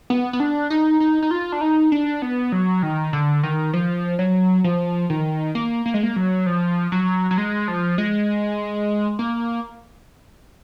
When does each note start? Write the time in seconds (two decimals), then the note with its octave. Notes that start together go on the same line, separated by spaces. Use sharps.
0.10 B3
0.33 B3
0.40 D4
0.70 D#4
1.00 D#4
1.22 D#4
1.31 F4
1.52 D4
1.61 D#4
1.92 D4
2.22 B3
2.52 F#3
2.83 D#3
3.13 D3
3.43 D#3
3.74 F3
4.19 F#3
4.64 F3
5.10 D#3
5.55 A#3
5.86 A#3
5.94 G#3
6.03 A#3
6.16 F#3
6.46 F3
6.92 F#3
7.31 F#3
7.38 G#3
7.68 F3
7.98 G#3
9.19 A#3